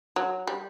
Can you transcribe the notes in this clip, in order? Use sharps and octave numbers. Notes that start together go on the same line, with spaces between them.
F#3
G3